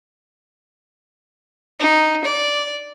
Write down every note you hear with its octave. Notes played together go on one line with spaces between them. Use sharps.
D#4
D5